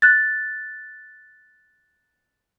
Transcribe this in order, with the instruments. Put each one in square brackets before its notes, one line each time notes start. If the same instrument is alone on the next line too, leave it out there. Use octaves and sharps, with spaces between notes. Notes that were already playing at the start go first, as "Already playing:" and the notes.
[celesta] F#6 A6